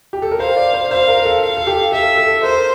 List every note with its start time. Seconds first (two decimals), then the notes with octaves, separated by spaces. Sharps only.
0.13 G4
0.22 A4
0.31 A#4
0.40 C5 F5
0.57 D5
0.74 C5
0.91 C5 F5
1.08 A#4
1.25 A4
1.42 F5
1.57 A4
1.67 G4
1.92 A4 E5
2.17 A4
2.43 A#4 C5